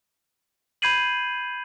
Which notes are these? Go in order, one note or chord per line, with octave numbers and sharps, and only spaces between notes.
B5 G6 G#6 C7 D#7 F#7